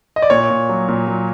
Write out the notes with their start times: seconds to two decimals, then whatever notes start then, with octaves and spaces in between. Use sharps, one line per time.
0.16 D#5
0.22 D5
0.30 A#2 C#5
0.50 A#2
0.69 F#3
0.88 A#2
1.07 F#3